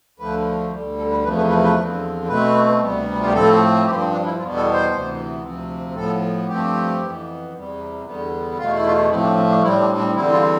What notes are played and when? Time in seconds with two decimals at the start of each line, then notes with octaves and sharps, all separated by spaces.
0.19 D2 D3 F3 A3 B4
0.72 D2 D3 G3
0.98 A4
1.11 B4
1.24 E2 C3 F3 A3 B4
1.37 B4
1.50 B4
1.64 B4
1.76 E2 D3 F3 C4
2.28 B2 A3 C4 B4
2.81 D2 C3 G3 B3
3.19 F4
3.26 G4
3.33 A2 F3 A3 C4 A4
3.85 G2 F3 C4 G4
4.00 C4
4.12 D4
4.25 E4
4.38 E2 B2 G3 B3 F4
4.56 A4
4.73 C5
4.92 D2 C3 E3 B3
5.43 D2 C3 F3 C4
5.95 A2 F3 B3 A4
6.48 G2 F3 A3 C4 G4
7.00 F2 E3 B3
7.54 E2 C3 G3
8.06 E2 D3 G3 B3
8.58 E2 B2 A3 F4
8.72 E4
8.85 F4
9.10 A2 F3 A3 C4 E4
9.23 D4
9.37 C4
9.50 D4
9.63 A2 G3 C4 E4
9.80 D4
9.98 D4
10.15 E2 D3 G3 C4 E4
10.33 F4